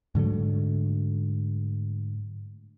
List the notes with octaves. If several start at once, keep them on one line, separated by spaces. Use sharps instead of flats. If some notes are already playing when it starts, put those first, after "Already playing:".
G#2 D3 F#3 A3